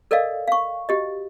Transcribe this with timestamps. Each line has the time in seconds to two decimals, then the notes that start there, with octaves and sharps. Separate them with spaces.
0.11 A4 A#4 D5 D#5 F5
0.48 F5 C#6
0.89 F#4 G4 D#5